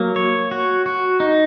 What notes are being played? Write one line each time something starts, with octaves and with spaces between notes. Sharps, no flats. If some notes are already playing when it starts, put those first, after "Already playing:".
Already playing: F#3 A#3
C#5
F#4
F#4
D#4